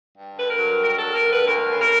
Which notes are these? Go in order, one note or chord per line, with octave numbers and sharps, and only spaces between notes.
G2
D3 B4
A#4
F#3
G2 A#4
A4
G2
A#4
D3
B4
D2 A#4
C#3
A#4